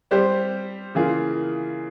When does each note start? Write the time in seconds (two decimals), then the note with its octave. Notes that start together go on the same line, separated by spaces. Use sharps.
0.11 G3 C4 G4 C5
0.95 C#3 E3 A#3 F4 G#4